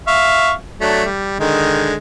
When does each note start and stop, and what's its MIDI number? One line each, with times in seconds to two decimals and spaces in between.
0.08 0.53 76
0.08 0.53 77
0.08 0.53 85
0.81 1.04 54
0.81 1.04 57
0.81 1.04 62
1.05 1.35 55
1.40 1.95 50
1.40 1.95 51
1.40 1.95 56